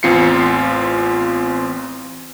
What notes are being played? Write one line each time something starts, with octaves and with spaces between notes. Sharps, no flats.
A1 E2 C4 F4 C7 C#7